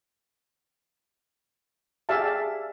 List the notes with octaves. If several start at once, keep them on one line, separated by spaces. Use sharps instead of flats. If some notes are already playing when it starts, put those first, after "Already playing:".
G4 G#4 D5 E5 F5 A5